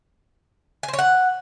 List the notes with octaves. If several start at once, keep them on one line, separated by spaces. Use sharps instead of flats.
G#5
C5
C#5
F#5